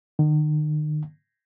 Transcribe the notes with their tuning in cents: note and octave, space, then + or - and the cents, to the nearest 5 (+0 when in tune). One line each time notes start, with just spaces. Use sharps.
D#3 -40